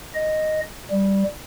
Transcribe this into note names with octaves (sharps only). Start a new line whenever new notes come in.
D#5
G3